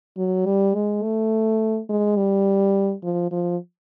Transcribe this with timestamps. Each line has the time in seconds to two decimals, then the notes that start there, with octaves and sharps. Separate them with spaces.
0.17 F#3
0.45 G3
0.75 G#3
1.03 A3
1.89 G#3
2.17 G3
3.03 F3
3.31 F3